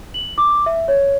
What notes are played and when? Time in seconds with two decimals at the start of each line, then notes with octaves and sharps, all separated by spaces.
0.14 F#7
0.38 D6
0.66 E5
0.88 C#5